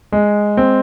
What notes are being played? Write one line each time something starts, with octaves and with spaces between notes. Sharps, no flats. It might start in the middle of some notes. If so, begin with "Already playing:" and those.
G#3
C4